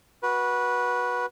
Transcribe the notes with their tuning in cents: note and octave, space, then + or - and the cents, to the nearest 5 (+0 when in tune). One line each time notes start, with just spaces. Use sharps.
F#4 +0 B4 -15